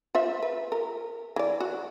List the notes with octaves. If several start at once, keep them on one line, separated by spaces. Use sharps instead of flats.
F4 C5 E5
B4
A#4
E3 D5
F#4